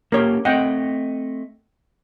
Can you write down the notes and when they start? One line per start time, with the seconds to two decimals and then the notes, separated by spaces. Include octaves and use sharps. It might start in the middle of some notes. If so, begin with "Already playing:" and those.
0.12 A#3 C#4 G4 A#4 C#5
0.45 A3 C4 D#5 F#5 G5